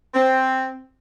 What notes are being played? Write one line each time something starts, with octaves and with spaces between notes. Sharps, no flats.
C4